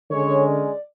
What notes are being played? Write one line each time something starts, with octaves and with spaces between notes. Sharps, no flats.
D3 G#3 C#4 C#5
D5